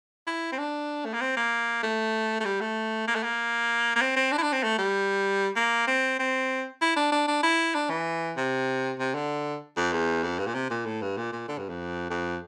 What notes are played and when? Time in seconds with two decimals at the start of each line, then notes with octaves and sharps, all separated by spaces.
0.27 E4
0.52 C4
0.58 D4
1.05 A3
1.13 A#3
1.21 C4
1.37 A#3
1.83 A3
2.40 A3
2.45 G3
2.61 A3
3.08 A#3
3.16 A3
3.23 A#3
3.95 A#3
4.01 C4
4.17 C4
4.32 D4
4.38 E4
4.42 D4
4.52 C4
4.63 A3
4.78 G3
5.56 A#3
5.87 C4
6.19 C4
6.81 E4
6.96 D4
7.12 D4
7.28 D4
7.43 E4
7.74 D4
7.90 E3
8.37 C3
8.99 C3
9.15 D3
9.77 F2
9.92 E2
10.23 F2
10.39 G2
10.47 A#2
10.54 C3
10.70 A#2
10.86 A2
11.02 G2
11.17 A#2
11.33 A#2
11.48 D3
11.58 G2
11.69 F2
12.10 F2